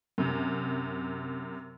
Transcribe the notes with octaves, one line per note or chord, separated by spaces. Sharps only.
F#2 C3